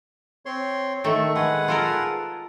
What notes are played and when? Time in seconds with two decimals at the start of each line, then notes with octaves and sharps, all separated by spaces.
0.46 C4 C#5 C6
1.04 D#3 A3 A4 C#6
1.36 G#3 G#4 B4 F#5
1.68 F4 A4 A#4